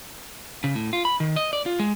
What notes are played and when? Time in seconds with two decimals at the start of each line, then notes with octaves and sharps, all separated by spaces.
0.64 C#3
0.75 A2
0.93 F4
1.05 B5
1.20 D#3
1.36 D#5
1.53 D5
1.66 F4
1.80 G#3